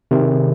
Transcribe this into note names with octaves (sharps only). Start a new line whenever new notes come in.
C3 D#3 C4